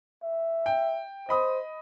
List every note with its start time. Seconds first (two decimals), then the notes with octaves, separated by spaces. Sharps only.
0.23 E5
0.66 G5
1.29 C5 D#5 B5 D#6